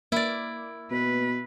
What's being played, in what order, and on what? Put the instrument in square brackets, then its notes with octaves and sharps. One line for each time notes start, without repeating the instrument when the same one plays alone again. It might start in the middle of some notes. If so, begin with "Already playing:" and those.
[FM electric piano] A#3 [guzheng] E4 D5
[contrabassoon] B2 [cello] B4